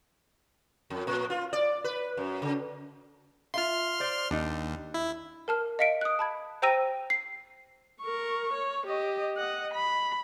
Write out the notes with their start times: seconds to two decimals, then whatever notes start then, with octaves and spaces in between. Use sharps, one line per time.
0.90 F2
1.07 A#2
1.30 F4
1.53 D5
1.84 B4
2.17 F#2
2.42 C#3
3.54 F4 E5 F5 C6 F6
4.00 C5 D5
4.31 D#2 D4 D#4
4.94 E4
5.48 A#4 A5 F6
5.79 D#5 F5 B6 C#7 D7
6.01 D#6 F#6
6.19 A5 B5 G#6
6.62 C5 G5 A#5 E6 A#6 D#7
7.10 C7
8.01 A#4 C#6
8.53 C#5
8.87 G4 D#5
9.37 D#5 F#5
9.74 B5